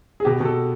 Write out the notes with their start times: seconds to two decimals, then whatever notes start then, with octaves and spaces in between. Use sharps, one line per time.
0.20 G#4
0.25 B2 G4
0.40 B2
0.45 A4